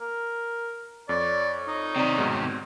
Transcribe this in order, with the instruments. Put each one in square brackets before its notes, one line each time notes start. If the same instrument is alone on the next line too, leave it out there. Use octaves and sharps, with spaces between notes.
[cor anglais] A#4
[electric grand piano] F2 [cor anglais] C#5 [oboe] D5
[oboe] D#4
[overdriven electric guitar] C3 D#3 [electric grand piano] C4 D5 A#5
[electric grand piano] G#2 B2